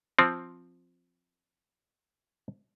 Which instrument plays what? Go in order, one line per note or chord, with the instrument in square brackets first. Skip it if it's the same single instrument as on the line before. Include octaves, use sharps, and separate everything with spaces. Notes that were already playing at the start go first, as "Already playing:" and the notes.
[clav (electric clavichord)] F3 C4